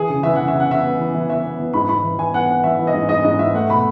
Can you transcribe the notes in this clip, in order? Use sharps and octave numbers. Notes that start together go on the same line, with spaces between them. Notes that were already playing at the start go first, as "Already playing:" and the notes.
Already playing: E3 G#4
C#3
E3 E5
C#3 F#5
E5
C#3
F#5
C#3 E5
B3
E3
E3
B3 E5
B3
E3
G#2 B5
G#2 B5
E3
E3 G#5
B3 F#5
B3 F#5
E3 E5
E3
D#5
G#2
G#2 D#5
G#2 D#5
G#2 E5
A3 F#5
B2 B5